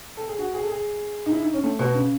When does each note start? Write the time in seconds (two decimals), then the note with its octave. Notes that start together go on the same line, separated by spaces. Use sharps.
0.17 A4
0.28 G#4
0.39 F#4
0.54 G#4
0.63 A4
0.70 G#4
1.26 D#4
1.32 E4
1.43 D#4
1.53 C#4
1.64 A3
1.79 B2
1.94 C#3